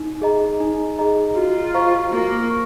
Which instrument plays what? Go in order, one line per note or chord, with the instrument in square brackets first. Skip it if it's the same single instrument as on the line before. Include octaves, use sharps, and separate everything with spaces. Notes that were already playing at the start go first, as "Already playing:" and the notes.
Already playing: [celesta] D#4
G#4 D#5 A#5
D#4
G#4 D#5 A#5
[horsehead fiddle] F4 [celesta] F#4
[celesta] C5 F5 A#5 C#6
[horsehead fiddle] A#3 [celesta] F#4
[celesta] C#6